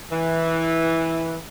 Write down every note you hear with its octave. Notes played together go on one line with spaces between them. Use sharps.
E3